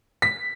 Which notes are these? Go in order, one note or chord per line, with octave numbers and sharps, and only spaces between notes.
B6